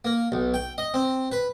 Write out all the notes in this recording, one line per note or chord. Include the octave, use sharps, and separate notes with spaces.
A#3
B1
G5
D#5
C4
B4